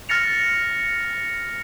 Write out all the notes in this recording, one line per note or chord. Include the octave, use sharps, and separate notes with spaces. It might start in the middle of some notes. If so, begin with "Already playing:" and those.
F6 A6 A#6 C#7 F7